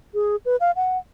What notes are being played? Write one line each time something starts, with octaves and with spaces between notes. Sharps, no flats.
G#4
B4
F5
F#5